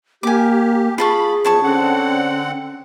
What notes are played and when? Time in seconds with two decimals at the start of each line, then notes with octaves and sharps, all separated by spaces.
0.23 A#3 G4 G#5 D6
0.98 F4 G#4 A5 B5 C#6
1.45 E2 F3 C#5 A5 C#6
1.63 D3 C4 C#4 F#5